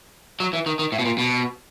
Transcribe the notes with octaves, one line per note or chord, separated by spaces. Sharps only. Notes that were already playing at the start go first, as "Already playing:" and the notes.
F#3
E3
D#3
D#3
A2
B2
A#2
B2